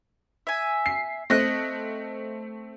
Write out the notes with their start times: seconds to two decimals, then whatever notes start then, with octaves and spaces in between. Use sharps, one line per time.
0.47 E5 G#5
0.86 C7
1.30 A3 C4 D#5 F#6